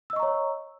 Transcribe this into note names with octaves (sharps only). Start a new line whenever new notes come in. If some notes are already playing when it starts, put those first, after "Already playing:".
C#5 D#5 A#5 C#6 E6